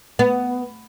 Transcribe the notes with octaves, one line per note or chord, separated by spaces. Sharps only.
B3